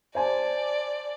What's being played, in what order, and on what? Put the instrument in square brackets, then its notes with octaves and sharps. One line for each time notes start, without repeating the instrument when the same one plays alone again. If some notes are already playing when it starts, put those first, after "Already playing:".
[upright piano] C5 G#5 A5 [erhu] D5